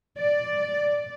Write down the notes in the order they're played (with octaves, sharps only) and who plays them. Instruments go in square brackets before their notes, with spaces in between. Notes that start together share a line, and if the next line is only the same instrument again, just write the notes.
[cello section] D5